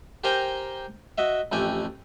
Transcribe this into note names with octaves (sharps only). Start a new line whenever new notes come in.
G4 A#4 C5 G5 G#5 A#5
F#4 D#5 E5
A1 F2 A3 G4 G#5